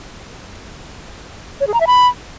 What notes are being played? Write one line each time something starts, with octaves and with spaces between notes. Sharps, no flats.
C#5
G#4
A#5
E5
B5